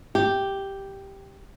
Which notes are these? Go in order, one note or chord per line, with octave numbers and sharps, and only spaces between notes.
G4